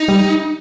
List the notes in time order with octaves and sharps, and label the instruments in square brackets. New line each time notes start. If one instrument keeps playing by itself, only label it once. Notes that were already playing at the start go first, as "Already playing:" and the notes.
Already playing: [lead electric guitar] D#4
[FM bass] G3